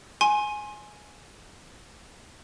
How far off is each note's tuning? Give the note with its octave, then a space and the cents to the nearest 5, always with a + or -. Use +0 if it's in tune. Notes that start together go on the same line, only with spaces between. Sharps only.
G#5 +10 C6 +30